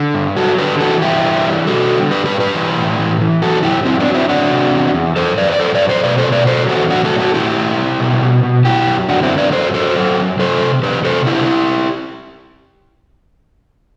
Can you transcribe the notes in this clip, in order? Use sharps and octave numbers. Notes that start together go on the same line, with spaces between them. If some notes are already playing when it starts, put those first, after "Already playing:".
Already playing: D3
G2
F#3 F#4 A4
D3 G4 B4
E3 F#4 A4
G2 E4 G4
E3
G3
G3 F#4 A4
D3
G2 G4 B4
G4 B4
G2
G4 B4
E3
A2
E3
E3
F#2 F#4 A4
F#2 E4 G4
F#2 C4 E4
B3 D4
F#3
C4 E4
F#3 D4 F#4
C3
E2
E2
F#2 A4 C5
F#2 B4 D5
D5
F#2 A4 C5
B4 D5
F#2
A4 C5
B2 B4 D5
A4 C5
B2
B4 D5
F#3 A4 C5
E2 F#4 A4
A2 D4 F#4
F#4 A4
F#3
F#4 A4
A2 E4 G4
A2
G3
B2
B2
B2
F#2 E4 G4
F#2
D3 D4 F#4
C4 E4
F#2
B4 D5
F#3 A4 C5
F#3 A4 C5
F#3
F#2
C3 A4 C5
C3
E2 G4 B4
C3 A4 C5
D3 E4 G4